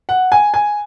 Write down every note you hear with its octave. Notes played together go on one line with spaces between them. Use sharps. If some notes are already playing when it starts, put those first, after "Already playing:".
F#5
G#5
G#5